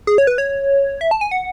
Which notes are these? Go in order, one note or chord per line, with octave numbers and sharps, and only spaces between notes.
G#4
C#5
B4
C#5
E5
A5
G#5
F#5